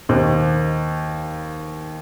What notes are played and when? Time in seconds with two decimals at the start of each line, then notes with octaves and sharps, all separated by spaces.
0.09 D#2 C5